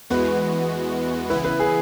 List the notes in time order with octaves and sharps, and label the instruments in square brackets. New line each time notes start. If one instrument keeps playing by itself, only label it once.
[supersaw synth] E2 E3 G#3 B3 F#4 [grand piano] B4
[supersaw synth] C#3 E3 B3 E4 [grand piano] B4
[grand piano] B4
G#4